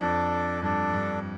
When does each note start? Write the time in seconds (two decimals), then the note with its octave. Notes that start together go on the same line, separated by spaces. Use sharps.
0.01 F2 D4 A4 D5
0.62 G2 D4 A4 D5
0.93 G2